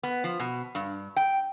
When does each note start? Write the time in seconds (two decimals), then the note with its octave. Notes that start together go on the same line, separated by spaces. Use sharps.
0.03 B3
0.24 F3
0.40 B2
0.75 G2
1.16 G5